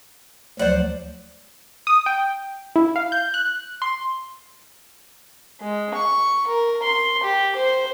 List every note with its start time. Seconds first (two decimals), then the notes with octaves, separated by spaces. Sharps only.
0.59 D2 F3 F#3 C5 D5 F#5
1.87 D#6
2.06 G5
2.76 E4
2.96 F5
3.12 G6
3.34 F#6
3.82 C6
5.61 G#3
5.94 C#6
6.47 A#4
6.83 C6
7.23 G4
7.56 C5